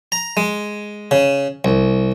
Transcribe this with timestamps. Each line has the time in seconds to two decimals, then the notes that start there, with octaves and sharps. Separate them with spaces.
0.12 A#5
0.37 G#3
1.11 C#3
1.64 C2